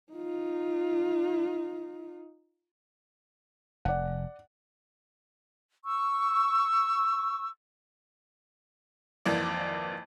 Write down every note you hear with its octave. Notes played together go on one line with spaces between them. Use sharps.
D#4 F4
F1 D5 F#5
C#6 E6
G#1 F2 E3 A#3 D5